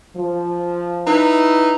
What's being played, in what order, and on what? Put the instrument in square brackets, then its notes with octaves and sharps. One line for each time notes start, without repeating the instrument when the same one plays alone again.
[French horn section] F3
[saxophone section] D#4 E4 B4